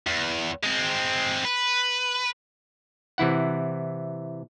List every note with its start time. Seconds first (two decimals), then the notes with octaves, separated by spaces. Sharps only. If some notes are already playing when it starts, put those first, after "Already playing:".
0.07 E2
0.64 G#3 C4
1.45 B4
3.18 C3 E3 E4 F#5